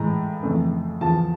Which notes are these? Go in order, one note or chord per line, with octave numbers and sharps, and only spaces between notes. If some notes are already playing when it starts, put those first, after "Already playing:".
Already playing: A2 E3 G#3 A#5
F2 C#3 E3 A3
E2 C#3 F3 A5